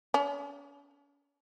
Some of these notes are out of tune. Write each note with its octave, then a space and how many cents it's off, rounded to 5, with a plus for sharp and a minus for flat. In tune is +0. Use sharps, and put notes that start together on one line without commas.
C#4 +45